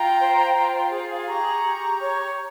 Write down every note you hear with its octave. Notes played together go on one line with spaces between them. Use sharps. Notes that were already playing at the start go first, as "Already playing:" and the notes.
Already playing: F4 G5 A#5
C5
F4
G#4
G4 A#5 C#6
G4
C#5